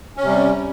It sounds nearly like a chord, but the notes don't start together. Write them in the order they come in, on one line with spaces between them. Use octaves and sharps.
C#4 C3 G3